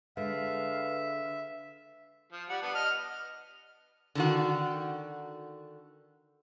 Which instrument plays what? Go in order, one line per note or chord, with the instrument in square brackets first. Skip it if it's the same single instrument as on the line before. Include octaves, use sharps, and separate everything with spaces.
[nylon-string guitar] D3 G#3 [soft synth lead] B4 [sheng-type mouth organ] E5 [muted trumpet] F5
[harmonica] F3
G3 F#5
B3 D4
D#5 F6
[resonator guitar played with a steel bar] D3 D#3 F#4